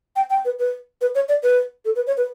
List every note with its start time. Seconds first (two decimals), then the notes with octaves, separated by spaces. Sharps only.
0.16 G5
0.30 G5
0.45 B4
0.59 B4
1.01 B4
1.15 C#5
1.29 D5
1.43 B4
1.85 A4
1.96 B4
2.07 C#5
2.17 B4